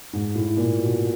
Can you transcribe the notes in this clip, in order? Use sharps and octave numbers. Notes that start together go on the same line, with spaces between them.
G#2
A2
A#2
B2